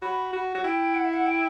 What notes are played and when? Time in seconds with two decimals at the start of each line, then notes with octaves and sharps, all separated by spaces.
0.02 F#4 B5
0.33 F#4
0.54 F#4
0.64 E4 G5
0.95 F#5
1.05 E5
1.13 F#5
1.26 G5